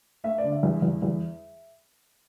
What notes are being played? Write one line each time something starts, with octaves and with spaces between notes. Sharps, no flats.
A3 E5
D5
D3
E5
E2
E2
E2